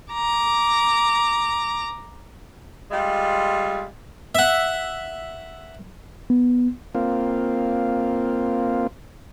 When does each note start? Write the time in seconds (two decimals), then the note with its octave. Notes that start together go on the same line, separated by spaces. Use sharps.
0.13 A#5 D6
2.90 G3 G#3 F4
4.35 E5 F#5
6.30 B3
6.95 A#3 C4 F4